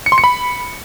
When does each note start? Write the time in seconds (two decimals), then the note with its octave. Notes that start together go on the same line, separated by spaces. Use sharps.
0.06 C#7
0.12 C6
0.18 C#7
0.24 B5